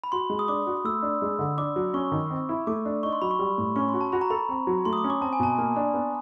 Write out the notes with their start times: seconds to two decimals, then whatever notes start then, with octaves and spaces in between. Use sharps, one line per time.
0.04 B5
0.12 F#4 C6
0.30 G#3
0.39 D#6
0.48 D4 D6
0.67 F#4
0.85 A3 E6
1.02 D4
1.22 G#3
1.39 D3
1.58 D4 D6
1.76 F#3
1.94 C#4 C#6
2.12 D#3
2.30 C4
2.49 E4
2.67 A3 D6
2.85 D4
3.03 D#4 C#6
3.13 C6
3.22 F#3 B5
3.31 C#6
3.39 G3
3.58 A2
3.76 C#4 C#6
3.89 C6
3.94 F#4
4.01 A5
4.12 F#4 B5
4.21 A#5
4.30 A4 B5
4.49 C4
4.67 F#3
4.85 A3 C6
4.93 D#6
4.98 D6
5.04 C#4
5.10 D6
5.21 C4 A5
5.33 G#5
5.40 B2 A5
5.58 A#3
5.76 D4
5.94 B3